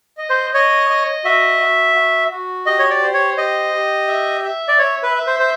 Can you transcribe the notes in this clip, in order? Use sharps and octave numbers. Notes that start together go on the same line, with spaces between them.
D#5
C5
C#5 D#5
D#5
F#4 E5
F#4
F#4
F#4
G4 D#5
C#5
D5
C5
C#5
G4 D#5
G4
E5
E5
D5
C#5 E5
B4
E5
C5
C5